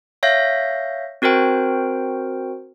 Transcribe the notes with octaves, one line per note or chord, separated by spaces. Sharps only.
C#5 E5 F5 G6 A#6
C4 F#4 A#4 C5 G5